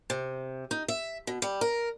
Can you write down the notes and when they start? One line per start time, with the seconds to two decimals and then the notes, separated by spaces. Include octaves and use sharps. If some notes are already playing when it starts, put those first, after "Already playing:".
0.10 C3
0.71 D#4
0.88 E5
1.27 B2
1.42 G3
1.61 A#4